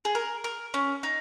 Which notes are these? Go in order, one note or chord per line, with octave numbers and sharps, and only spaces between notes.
G#4
A#4
A#4
C#4
D#4